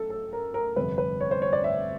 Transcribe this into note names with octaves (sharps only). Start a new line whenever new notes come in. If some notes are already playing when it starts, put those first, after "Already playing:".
Already playing: F#3 A3 A4
A4
A#4
A#4
G1 F2 C3 B4
B4
C#5
C5
C#5
D5
E5